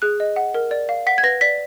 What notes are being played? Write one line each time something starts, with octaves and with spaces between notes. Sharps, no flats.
G#4 F#6
D#5
F#5
A#4
D5
F5
F#5 B6
G#6
B4 A#6
D5 B6